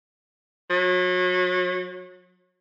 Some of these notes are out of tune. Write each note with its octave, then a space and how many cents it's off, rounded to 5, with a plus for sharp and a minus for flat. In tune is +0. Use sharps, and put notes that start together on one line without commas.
F#3 -30